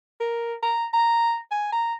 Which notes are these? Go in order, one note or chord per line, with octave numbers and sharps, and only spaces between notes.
A#4
A#5
A#5
G#5
A#5